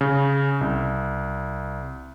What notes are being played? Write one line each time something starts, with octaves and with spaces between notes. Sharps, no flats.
C#3
C2